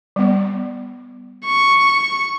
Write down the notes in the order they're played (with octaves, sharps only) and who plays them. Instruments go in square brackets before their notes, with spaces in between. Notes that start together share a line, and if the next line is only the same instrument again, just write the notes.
[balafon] G3 B3
[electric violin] C#6